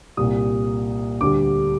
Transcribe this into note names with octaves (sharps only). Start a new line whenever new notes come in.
C2 A#2 G3 D#6
D2 D3 G3 D6